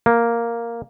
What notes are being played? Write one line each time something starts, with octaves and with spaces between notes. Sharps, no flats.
A#3